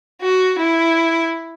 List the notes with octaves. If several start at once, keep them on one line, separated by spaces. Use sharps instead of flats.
F#4
E4